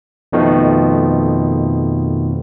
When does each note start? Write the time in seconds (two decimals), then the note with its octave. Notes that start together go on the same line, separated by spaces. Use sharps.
0.33 F2 B2 D#3 F3 A3